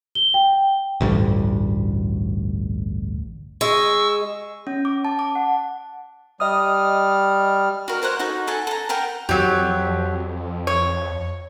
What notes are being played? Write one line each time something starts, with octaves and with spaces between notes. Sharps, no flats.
G7
G5
A1 D2 G2
G#3 C#6 E6
C#4
D6
A5
D6
F#5
G3 D#5 D#6 F6
F#4 A#4
A#4 C5 C#5 F#5
D#4 F#4 A4
A4 F#5 G#5
A4 A#5
A#4 F#5 G5 A#5
F2 F#3 G4
C#5